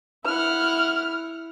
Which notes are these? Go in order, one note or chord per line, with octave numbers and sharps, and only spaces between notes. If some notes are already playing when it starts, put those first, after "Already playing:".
E4 F#5 F6